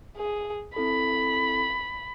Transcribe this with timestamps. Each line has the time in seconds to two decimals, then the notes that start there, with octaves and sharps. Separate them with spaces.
0.17 G#4
0.76 C4 E4 A4 B5